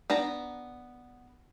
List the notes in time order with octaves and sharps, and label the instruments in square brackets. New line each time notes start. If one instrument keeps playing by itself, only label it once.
[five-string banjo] B3 D4 A#5